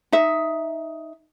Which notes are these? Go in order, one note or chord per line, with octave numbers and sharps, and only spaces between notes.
D#4 E5